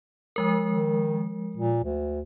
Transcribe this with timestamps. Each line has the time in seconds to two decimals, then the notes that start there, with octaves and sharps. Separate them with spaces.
0.36 F3 G#3 A#4
0.67 D#3
1.57 A#2
1.84 D2